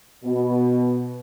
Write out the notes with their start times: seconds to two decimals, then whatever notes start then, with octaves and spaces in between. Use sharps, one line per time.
0.24 B2